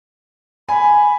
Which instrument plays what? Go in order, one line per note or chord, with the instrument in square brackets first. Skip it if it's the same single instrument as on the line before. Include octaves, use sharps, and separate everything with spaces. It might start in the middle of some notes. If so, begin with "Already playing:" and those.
[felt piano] G#5 [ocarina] B5